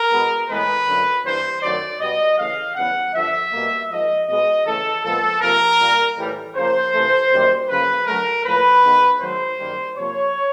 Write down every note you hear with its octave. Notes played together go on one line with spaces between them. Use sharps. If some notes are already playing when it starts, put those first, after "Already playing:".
Already playing: A#4
B2 G#3 B3
A2 E3 G#3 B3 B4
F#2 D3 F#3
G2 E3 G3 A#3 C5
F#2 D#3 F#3 A3 D5
B2 G3 B3 D#5
C#3 E3 A3 F5
C#3 E3 G3 B3 F#5
G2 D3 F3 E5
B2 G3 A#3
G#2 F3 A#3 D#5
B2 G#3 B3 D#5
C#3 E3 A3 A4
A#2 F3 G#3 B3 A4
C3 F3 A#3 A#4
A#2 G3 A#3
A2 E3 G3
C#3 F3 A#3 C5
C3 E3 A3
F#2 D#3 G3 A#3
F#2 C#3 F3 A#3 B4
D3 F#3 A3 A#4
A2 F3 A#3 B4
G#2 D#3 G#3 B3
G#2 D#3 F#3 A3 C5
F#2 D#3 G3 A#3
C3 F3 A#3 C#5